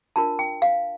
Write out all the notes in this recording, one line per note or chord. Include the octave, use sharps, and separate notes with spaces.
D4 F4 A#4 A5
G5
F5